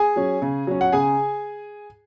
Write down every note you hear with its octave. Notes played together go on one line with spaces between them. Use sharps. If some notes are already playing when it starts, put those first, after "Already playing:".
Already playing: G#4 G#5
F#3 C#4
C#3
F#3 C#4
F#5
C#3 G#4 G#5